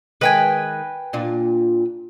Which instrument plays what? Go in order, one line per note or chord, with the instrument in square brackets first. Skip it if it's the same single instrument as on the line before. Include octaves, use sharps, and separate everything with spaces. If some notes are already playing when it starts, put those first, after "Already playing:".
[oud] D#3 G#3 [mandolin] B4 G5 G#5
[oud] A#2 D4 F4